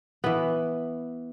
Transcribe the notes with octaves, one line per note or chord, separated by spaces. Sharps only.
E3 B3